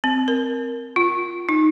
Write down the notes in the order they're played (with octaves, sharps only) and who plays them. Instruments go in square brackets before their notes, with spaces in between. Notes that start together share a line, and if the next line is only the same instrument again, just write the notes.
[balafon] C4
A#4
F4
D#4